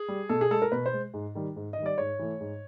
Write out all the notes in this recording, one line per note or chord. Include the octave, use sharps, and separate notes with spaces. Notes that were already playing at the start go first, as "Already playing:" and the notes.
Already playing: G#4
G3
B2 A4
G#4
G#3 A4
A#4
B2 B4
C5
G#3
G#2
D#3 G3
G#2
D#3 D#5
G3 D5
G#2 C#5
E3 A3
G#2